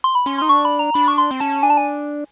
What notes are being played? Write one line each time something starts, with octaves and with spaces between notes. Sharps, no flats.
C6
B5
C#4 C6
D#4 C6
D4 C#6
B5
A#5
D4 B5
C#6
C6
C4
C#4 A5
D4 G#5
A5
G#5